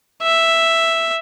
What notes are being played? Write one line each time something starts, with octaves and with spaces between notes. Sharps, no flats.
E5